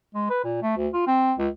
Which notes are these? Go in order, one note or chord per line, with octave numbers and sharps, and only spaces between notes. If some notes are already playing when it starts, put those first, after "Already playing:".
G#3
B4
A#2
A3
D2
F4
C4
C#2